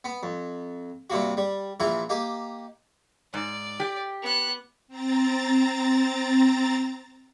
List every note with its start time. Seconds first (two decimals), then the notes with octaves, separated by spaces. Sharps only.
0.04 B3
0.23 F2
1.10 G2 C3 A#3 F#4
1.37 G3
1.80 A#1 E3 E4 F4
2.09 A#3 D#4 G4
3.34 G#2 D5
3.80 G4
4.22 B3 F#6
4.88 C4 A#5 A6